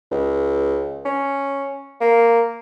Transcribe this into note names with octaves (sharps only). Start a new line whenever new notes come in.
C#2
C#4
A#3